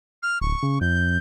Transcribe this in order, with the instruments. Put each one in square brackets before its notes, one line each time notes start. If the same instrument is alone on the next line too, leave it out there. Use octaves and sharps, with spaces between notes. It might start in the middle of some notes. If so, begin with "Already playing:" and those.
[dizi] F6
[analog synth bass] D1 [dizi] C#6
[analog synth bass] C#3
[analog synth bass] F2 [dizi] G6